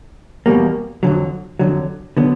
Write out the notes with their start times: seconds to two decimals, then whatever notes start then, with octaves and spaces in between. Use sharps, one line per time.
0.46 E2 B2 G3 A#3
1.03 F2 D3 F#3
1.59 F2 D3 F#3
2.17 D3 F#3 B3